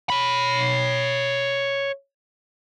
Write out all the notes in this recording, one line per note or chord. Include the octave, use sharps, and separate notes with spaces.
C#5 B5